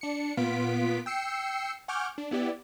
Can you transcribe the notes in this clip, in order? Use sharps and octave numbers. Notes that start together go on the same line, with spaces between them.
D4 C#7
A#2 B3 F4 B6 D7
G5 E6 C7 C#7
F#5 G#5 C#6 D6 F6 G6
D4
B3 E4 G4 D5